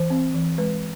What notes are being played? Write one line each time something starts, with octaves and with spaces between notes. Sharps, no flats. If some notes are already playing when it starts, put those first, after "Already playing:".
Already playing: E3 C5
C4
E3
G#3 B4